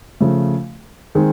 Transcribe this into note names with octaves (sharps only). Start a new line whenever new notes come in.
C#3 F3 A3
D#3 G#3 C4